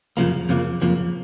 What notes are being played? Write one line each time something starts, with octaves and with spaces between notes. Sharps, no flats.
F2 C#3 F3 A#3
F2 C#3 F3 A#3
F2 C#3 F3 A#3